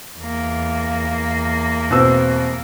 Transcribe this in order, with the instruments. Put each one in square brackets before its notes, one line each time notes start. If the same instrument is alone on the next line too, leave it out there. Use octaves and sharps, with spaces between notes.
[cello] E2 A#3
[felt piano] B2 C4 E6